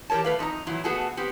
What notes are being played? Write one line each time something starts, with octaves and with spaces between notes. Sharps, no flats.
E3 G4 A#4 C#5 A5
A3 B4 F5
F2 D#4 D#5 A#5
A#2 E3 F#3 E4
A3 B3 F#4 G#4 A4
B3 C4 G4